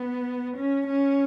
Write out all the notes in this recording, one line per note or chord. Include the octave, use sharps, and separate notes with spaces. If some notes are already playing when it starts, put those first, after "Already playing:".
Already playing: B3
C#4
C#4